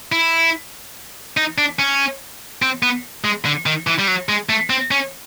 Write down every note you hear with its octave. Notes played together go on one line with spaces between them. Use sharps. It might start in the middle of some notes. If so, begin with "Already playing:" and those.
E4
D#4
D4
C#4
C4
B3
G#3
D3
D#3
E3
G3
F#3
G#3
A3
C4
C#4